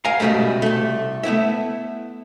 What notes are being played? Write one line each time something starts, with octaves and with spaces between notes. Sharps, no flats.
A#4 F5 F#5 G#5 A#5
C#2 B2 F#3 G3 A3
C2 A3
A3 B3 E4 E5